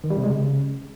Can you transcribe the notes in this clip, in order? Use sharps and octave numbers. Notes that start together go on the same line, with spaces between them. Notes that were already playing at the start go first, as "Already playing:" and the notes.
D#3
G3
C3
G#3
C#3